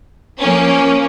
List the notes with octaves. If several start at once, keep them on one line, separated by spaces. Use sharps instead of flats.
F3 A#3 C#4